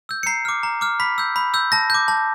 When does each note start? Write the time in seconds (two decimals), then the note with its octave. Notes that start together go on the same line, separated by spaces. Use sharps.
0.09 E6 G6
0.23 C#7
0.26 A#5 C7
0.45 D6 F6
0.63 A#5
0.81 D6 F6
1.00 B5 B6
1.18 E6 G6
1.36 B5
1.54 E6 G6
1.72 A5 A#6
1.90 D6 G6
2.08 A5